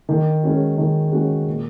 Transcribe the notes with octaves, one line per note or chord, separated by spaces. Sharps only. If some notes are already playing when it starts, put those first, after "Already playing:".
D#3
G#3 C#4 F#4
D#3
G#3 C#4 F#4
A#2